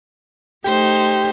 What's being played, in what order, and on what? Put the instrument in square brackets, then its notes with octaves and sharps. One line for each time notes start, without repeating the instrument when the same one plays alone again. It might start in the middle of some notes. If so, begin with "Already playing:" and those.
[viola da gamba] A3 D#4 C5 [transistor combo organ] G4